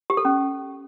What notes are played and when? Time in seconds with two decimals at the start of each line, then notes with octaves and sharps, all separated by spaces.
0.10 G4
0.17 A4
0.25 C#4